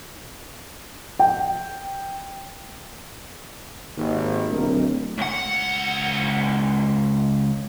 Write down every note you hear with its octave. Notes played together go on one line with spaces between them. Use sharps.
G5
G#1 D#2
D1 B1 A#4
C#2 F#5